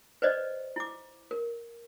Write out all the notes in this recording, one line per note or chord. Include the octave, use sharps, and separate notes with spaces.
B4 C5 D5 D#5
E4 D6
A#4